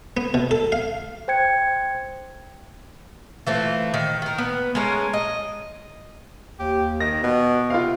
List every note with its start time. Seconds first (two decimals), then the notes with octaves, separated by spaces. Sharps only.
0.17 B3
0.34 B2
0.51 A4
0.72 F5
1.28 C5 G5 G#6 C#7
3.47 E3 A3 C4 F4
3.94 D#3
4.22 D#3 A#4
4.38 B3
4.75 G#3 A3 C#4 A#4
5.13 D#5
6.59 D#2 G4
7.00 D#3 A#6
7.23 B2 B3
7.70 C3 F4 F5